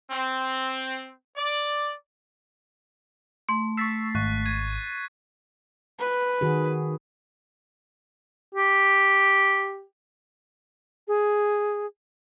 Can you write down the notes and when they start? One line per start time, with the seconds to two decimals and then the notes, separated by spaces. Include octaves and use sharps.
0.11 C4
1.37 D5
3.49 A3 C6
3.77 C#6 E6 A6 B6 C7
4.15 G#1 C#6 F#6
4.46 G#6 D#7
5.99 B4
6.41 D#3 F#4 G#4
8.55 G4
11.08 G#4